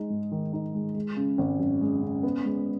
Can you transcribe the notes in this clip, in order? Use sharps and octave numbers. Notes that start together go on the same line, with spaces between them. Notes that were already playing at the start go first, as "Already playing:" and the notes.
Already playing: G#3 D#4
G#2
D#3
D#4
G#3
G#3
C#3
G#1
F#2
G#3
C#3
B3
G#3